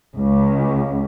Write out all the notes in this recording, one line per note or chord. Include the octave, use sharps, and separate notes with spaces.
C#2